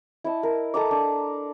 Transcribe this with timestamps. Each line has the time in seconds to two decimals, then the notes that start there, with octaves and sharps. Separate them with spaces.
0.24 E4 D#5 A5
0.43 A#4
0.74 A4 D#5 A#5 D6
0.91 D4